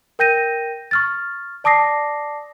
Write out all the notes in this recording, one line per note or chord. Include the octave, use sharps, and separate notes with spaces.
A#4 G5 G6 A#6 D#7
C#6 F6 A6
D5 A5 D6 D#6 A#6 C7